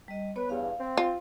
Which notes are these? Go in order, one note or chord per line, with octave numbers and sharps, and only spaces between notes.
G3 D#5
B3 B4 C#5
E2 G2 F5
C4
F4